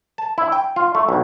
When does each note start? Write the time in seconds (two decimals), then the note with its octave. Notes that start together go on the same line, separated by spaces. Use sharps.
0.18 A5
0.38 E4
0.52 G5
0.76 F4
0.95 A3
1.09 B1